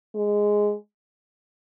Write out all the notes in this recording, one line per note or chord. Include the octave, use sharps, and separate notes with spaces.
G#3